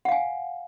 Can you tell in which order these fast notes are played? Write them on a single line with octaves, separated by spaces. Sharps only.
F#5 F5 G#5